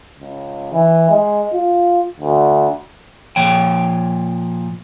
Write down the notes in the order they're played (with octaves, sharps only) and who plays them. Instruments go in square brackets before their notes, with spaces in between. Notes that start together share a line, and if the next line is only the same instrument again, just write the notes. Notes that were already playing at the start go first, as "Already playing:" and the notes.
[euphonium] C#2
E3
G#3
F4
D2
[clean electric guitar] A#2 F3 C#5 G5